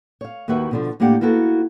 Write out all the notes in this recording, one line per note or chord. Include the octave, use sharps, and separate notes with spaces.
C#5 F5
D#2 D#3 E4 F#4 B4 E5
B2 D3 F3
A2 A#3 D4 G4 F#5
A#3 B3 E4 F#4 A4